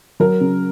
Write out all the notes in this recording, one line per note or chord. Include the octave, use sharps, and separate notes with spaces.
F#3 A#4
C#3